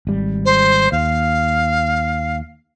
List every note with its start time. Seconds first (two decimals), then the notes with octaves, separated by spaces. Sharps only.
0.07 G#1 G3
0.45 C5
0.92 D#2 F5